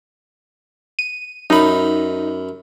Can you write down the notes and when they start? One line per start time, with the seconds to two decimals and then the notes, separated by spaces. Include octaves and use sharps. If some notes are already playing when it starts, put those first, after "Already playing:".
0.99 D#7
1.50 F#2 D#4 B5